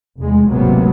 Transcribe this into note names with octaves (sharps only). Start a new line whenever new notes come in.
F1 E2 G#3
G#1 D2 C3 F#3 A#3 B3